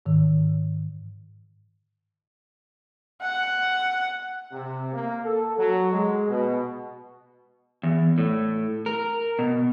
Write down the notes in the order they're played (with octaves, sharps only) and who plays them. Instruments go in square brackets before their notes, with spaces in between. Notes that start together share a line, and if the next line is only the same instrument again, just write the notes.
[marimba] G#2 D#3
[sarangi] F#5
[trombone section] C3
A#3
A4
F#3
G#3
B2
[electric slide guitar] E2
A2
A#4
B2